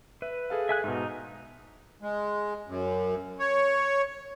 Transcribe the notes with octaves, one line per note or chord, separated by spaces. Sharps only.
B4 E5
G#4 A4 F5
E5 G#5 F#6
G#2 B2 D#4
G#3
F#2
C#5